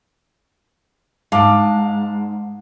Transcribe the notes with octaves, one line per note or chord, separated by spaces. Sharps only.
G#2 F5 A5 D6